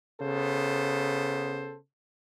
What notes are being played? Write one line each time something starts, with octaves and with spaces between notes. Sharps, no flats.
C#3 B3 A4 C5